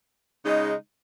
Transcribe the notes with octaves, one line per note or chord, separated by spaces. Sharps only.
C#3 G#3 D#4